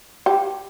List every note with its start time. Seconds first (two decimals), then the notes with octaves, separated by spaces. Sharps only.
0.26 G4